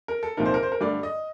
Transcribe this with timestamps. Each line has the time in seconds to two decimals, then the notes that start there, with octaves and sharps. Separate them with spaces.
0.08 A#4
0.23 A4
0.37 C2 A#2 F3 A#3 D#4 A#4
0.46 C5
0.54 A#4
0.63 C5
0.72 A#4
0.81 G2 D3 A3 D5
1.03 D#5